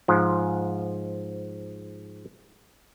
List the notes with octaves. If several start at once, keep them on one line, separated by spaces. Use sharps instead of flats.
G#2 F3